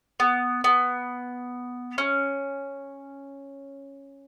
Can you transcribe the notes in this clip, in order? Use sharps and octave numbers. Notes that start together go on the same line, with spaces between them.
B3
B3
C#4